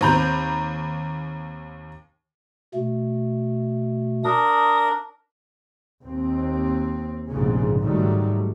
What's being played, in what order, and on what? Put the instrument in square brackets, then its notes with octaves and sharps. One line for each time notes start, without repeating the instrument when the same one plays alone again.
[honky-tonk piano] D#2 C4 A#5 B5 G6
[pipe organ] B2 A3
[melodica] D4 A#4 [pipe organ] D#6
[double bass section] D#2 C4
F1 A#1 G#2 C#3 C#4
G#2 D#3 F#3 G3 A3